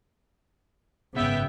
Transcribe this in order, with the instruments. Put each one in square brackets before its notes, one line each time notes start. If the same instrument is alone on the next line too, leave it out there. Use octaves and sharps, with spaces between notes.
[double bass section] G#1 F#2 C#3 [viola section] B3 E5 G5